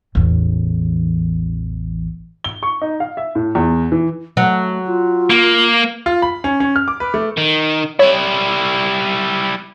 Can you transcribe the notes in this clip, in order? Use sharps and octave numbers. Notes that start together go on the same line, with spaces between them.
A1 E2
G7
C#6
D#4
F5
E5
A2
E2
E3
F#3 A3
F4
A#3
F4
B5
C#4
C#4
F6
D6
B4
A3
D#3
G3 E4 C#5